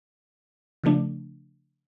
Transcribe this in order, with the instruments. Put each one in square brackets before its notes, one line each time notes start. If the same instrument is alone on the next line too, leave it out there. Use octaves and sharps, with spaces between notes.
[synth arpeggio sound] C#3 F3 A3 D4